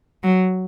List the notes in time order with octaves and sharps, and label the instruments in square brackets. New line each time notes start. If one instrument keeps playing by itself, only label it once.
[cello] F#3